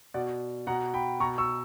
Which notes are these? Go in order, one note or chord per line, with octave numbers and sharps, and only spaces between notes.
B2 D5 F#5
B2 F#5 A#5
G5 B5
B2 A#5 C#6
C#6 E6